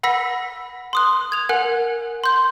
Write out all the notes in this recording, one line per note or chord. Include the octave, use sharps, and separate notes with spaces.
F#5 B5 E6 A#6 B6
C6 D#6 F#6
G#6 F7
A#4 F#5 G#5 F#6
C6 G6